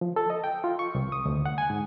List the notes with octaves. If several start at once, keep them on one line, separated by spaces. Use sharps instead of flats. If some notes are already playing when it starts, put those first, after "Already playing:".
F3
A4
D#5
G5
F4
C#6
C2
D#6
D2
F#5
G#5
G#2